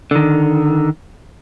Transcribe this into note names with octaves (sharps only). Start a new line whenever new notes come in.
D3 D#3